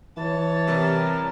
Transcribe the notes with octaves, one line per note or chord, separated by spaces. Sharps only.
E3 C#5 A5
C3 G3 A#4